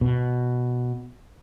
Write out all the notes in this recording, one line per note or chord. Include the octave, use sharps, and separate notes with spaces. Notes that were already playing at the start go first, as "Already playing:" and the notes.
B2